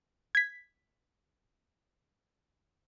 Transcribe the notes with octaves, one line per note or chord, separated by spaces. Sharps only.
G#6 B6